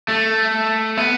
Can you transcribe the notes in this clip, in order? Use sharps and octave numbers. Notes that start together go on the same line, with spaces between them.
A3
B3